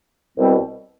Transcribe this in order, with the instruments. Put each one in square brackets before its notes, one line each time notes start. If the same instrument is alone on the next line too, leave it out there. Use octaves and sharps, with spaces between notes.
[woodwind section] C2 B2 G3 C4